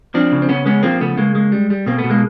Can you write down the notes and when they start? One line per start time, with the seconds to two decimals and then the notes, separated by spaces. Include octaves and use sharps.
0.14 F3 C4 D4
0.32 C#3
0.42 C4
0.49 C#3 B3 C#4
0.66 G#3 B3 C#4
0.83 F3 A#3 C4
1.00 C#3 A3 B3
1.18 C#3 G#3 A#3
1.35 G#3
1.52 G3
1.70 G3
1.86 B2 A#3 C4
1.98 A3 B3
2.04 B2
2.10 G#3 A#3